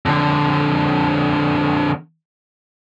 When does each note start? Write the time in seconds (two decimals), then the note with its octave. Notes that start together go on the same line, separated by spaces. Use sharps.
0.06 F2 D3